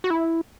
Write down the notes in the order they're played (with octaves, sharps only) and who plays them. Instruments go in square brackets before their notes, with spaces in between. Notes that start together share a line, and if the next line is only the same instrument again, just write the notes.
[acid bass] F#4
E4